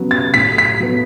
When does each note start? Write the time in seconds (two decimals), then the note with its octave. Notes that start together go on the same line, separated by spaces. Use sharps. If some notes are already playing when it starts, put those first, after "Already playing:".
Already playing: C#3 F#3 B3
0.11 A6
0.34 A2 B6
0.58 B6
0.80 F#3 B3